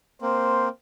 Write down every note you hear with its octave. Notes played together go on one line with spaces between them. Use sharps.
A#3 C4 C5